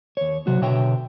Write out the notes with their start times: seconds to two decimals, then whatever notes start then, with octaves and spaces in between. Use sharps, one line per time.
0.17 D#2 C#5
0.47 C3 F#3 F#4
0.61 B2 D3 F#4 C#5 E5 G5